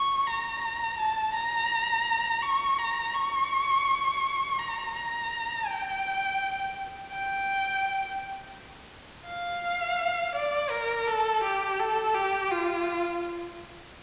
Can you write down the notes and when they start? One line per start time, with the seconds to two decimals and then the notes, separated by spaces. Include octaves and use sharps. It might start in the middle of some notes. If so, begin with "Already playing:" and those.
Already playing: C#6
0.27 A#5
0.98 A5
1.34 A#5
2.43 C#6
2.79 A#5
3.15 C#6
4.59 A#5
4.95 A#5
5.67 G5
7.11 G5
9.27 F5
10.35 D5
10.71 A#4
11.07 A4
11.43 G4
11.79 A4
12.15 G4
12.51 F4